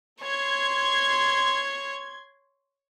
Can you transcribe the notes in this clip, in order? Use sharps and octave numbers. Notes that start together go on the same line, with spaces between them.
C#5 C6 G#6